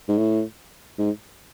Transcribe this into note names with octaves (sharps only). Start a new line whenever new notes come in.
G#2
A2
G#2